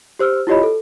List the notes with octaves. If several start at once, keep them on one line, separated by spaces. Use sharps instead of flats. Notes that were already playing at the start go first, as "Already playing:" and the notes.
G4 C5 E6 F6
E4 F4 G4 C#5 D#5 B5
A4